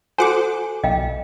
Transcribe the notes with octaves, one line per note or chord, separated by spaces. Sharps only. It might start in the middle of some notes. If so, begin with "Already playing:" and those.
F#4 A4 C5 F#5 G#5 D6
B1 D#5 F5 G5